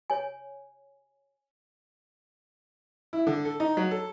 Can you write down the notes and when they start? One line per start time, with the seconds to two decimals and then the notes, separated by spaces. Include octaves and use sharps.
0.10 C#5 G#5
3.13 E4
3.27 D3
3.45 A4
3.60 D#4
3.77 F#3
3.91 A4